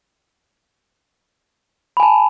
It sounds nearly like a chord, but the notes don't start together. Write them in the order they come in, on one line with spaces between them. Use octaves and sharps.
B5 G#5 A5